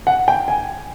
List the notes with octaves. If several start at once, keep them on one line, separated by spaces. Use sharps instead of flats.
F#5
G5
G#5